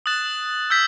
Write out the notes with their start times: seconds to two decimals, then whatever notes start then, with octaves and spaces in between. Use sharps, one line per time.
0.06 D#6 F#6 A6 E7
0.70 E6 G6 B6